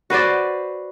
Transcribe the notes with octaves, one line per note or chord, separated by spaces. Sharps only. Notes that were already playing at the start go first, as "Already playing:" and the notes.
F#4 B4 C5 D5